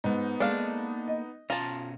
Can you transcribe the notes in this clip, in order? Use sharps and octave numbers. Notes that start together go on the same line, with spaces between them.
G#2 B3 D#4
G#3 A#3 D4 A4 F5
D#5
B2 C#4 F4 A5 A#5